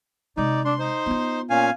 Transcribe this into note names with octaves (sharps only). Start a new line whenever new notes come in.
C3 G#3 D#4 D5
D4 C6
D#4 C5
B3 F4
A#2 C#4 F5 G#5